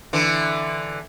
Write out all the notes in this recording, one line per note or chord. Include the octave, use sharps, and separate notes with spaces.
D3 E3